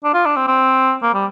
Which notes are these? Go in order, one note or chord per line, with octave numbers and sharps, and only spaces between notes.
D4
F4
D4
C4
C4
A#3
G3